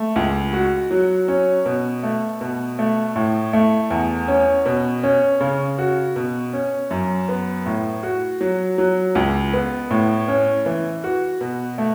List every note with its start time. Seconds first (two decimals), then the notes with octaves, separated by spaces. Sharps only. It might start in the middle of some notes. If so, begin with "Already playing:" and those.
Already playing: A3
0.16 C#2
0.53 F#4
0.91 F#3
1.28 C#4
1.65 B2
2.03 A3
2.41 B2
2.79 A3
3.16 A2
3.53 A3
3.90 E2
4.28 C#4
4.65 B2
5.03 C#4
5.41 C#3
5.78 F#4
6.16 B2
6.53 C#4
6.91 F#2
7.29 B3
7.66 A2
8.03 F#4
8.41 F#3
8.78 F#3
9.15 C#2
9.53 B3
9.90 A2
10.28 C#4
10.66 E3
11.04 F#4
11.41 B2
11.78 A3